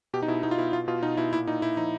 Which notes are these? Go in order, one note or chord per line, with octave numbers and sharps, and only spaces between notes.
B2 G4
D#4
B2 E4
B2 D#4
F4
B2 E4
B2 F4
B2 F4
B2 D#4
B2 E4
A#2 E4
A#2 D#4
A#2 E4
F3 D#4